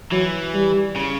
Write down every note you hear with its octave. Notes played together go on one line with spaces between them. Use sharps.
E3 F#3
G3
C#3